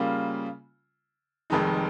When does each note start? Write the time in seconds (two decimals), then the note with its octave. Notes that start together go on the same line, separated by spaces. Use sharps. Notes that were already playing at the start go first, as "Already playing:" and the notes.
Already playing: C#3 G3 A#3 F4
1.50 F1 F2 D#3 G#3 D#4